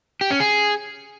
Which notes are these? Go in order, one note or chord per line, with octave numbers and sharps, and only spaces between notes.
G4
C#4
G#4